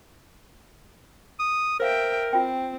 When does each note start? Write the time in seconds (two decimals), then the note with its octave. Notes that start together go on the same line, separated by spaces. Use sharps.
1.40 D#6
1.80 A#4 C5 E5 F5 G5
2.33 C4 F4 G5